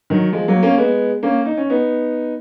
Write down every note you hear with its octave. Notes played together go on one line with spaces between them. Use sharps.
D#3 F#3
F3 G#3
F#3 A#3
A#3 C#4
G#3 B3
A#3 C#4
D#4
C#4
B3 D#4